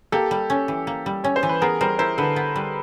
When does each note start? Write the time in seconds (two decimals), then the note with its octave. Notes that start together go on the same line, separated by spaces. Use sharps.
0.12 A#3 G4 A4
0.31 G3
0.50 C#4
0.68 E3
0.87 A#3
1.06 G3
1.24 C#4 C#5
1.36 C5
1.43 E3
1.49 B4
1.61 B3 G#4 A#4
1.81 G3 A#4 C5
1.99 E4 A#4 C5
2.18 D3 A4 B4
2.36 B3
2.56 G3